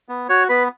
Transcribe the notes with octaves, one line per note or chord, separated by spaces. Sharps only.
B3
F#4 C#5
B3 B4